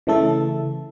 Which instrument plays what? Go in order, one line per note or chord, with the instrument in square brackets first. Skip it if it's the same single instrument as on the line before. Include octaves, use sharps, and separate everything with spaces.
[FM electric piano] C#3 E3 A3 A4